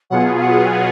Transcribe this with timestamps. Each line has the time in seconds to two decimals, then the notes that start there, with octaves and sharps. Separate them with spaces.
0.10 B2 F#3 B3 F4 G#4 F#5
0.36 F5
0.41 F#5
0.66 G#5
0.73 F#5